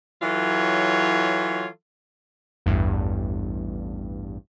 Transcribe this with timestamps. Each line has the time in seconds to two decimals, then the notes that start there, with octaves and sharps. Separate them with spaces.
0.22 E3 F#3 F4 A4 C#5
2.66 A1 E2 G2